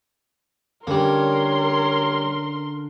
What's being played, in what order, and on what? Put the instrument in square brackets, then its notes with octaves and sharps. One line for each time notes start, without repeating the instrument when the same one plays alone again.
[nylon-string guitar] D3 C#4 [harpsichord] G3 A#3 [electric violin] A#4 C6 [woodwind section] C#5